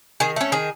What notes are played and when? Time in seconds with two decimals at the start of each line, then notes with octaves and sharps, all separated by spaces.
0.20 D#3 G#4
0.36 A3 C#4
0.52 D#3 G#4